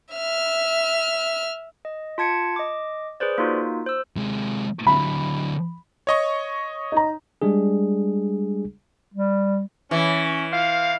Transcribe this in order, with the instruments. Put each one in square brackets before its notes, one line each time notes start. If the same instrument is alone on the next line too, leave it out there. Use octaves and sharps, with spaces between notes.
[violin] E5 F6
[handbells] D#5
F4 A5 G#6 C#7 D7
D#5 D6
G#4 B4 C5 D5
A#3 D#4 F4 F#4
C5 E6
[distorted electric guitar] C3 G#3
[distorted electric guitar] D3 F#3 [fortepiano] B5
[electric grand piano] C#5 D#5 C#6
[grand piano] D#4 A#5
[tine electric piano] G3 G#3 D4 G#4
[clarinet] G3
[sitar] E3 [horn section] C#4
[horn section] C5 F5